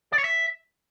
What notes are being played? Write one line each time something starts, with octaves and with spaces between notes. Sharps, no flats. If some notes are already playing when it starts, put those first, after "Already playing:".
D5
C#5
E5